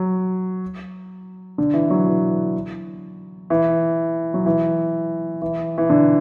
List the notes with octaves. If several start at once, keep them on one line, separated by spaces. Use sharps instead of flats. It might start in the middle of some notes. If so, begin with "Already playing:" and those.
Already playing: F#3
D3
E3
F#3
E3
E3
F#3
E3
E3
E3
D3